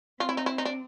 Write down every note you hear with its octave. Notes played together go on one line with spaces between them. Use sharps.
C4 F4
E4
D#4
E4
D#4
D4